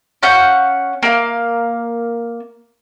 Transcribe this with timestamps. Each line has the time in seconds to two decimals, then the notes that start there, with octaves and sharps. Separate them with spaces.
0.23 C#4 F5 F#5 G6
1.03 A#3 F5